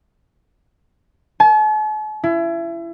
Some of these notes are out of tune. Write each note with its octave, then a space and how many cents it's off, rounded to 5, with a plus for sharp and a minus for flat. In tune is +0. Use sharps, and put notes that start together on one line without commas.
A5 -45
E4 +30